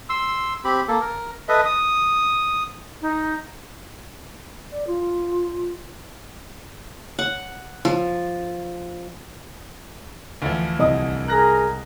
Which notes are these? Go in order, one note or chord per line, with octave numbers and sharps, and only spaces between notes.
C6 E6
C4 G4 B5
A#3 A4
A#4
A4 B4 D#5 E5
D#6
D#4
D5
F4
F#5
F3
D2 E3 F3
C2 D#5 D#6
G#4 A#4 F#6 A#6